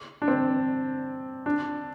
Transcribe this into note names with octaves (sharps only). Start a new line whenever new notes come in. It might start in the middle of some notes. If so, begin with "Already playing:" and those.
D4
C4
D4